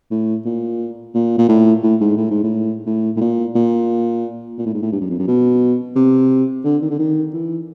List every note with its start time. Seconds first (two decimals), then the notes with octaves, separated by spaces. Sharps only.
0.11 A2
0.45 A#2
1.15 A#2
1.38 A#2
1.49 A2
1.83 A2
2.01 G#2
2.17 A2
2.30 G#2
2.44 A2
2.86 A2
3.16 A2
3.21 A#2
3.55 A#2
4.58 A#2
4.66 A2
4.74 G#2
4.82 A2
4.92 G2
5.01 F#2
5.10 F2
5.19 F#2
5.27 B2
5.96 C3
6.64 D3
6.82 D#3
6.90 D3
6.99 D#3
7.33 E3